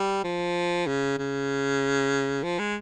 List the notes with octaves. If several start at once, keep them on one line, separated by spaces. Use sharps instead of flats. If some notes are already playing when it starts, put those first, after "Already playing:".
Already playing: G3
F3
C#3
C#3
F3
G#3